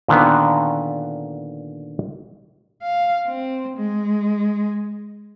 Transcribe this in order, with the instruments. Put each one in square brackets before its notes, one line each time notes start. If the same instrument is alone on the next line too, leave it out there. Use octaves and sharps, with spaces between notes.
[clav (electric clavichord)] A#2 D3 D#3 B3
[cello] F5
C4
G#3